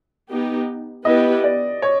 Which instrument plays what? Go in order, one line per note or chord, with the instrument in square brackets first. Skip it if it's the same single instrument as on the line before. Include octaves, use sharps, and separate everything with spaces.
[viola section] B3 D#4 G4
[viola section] B3 E4 G4 B4 [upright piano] D#5
[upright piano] D5
C#5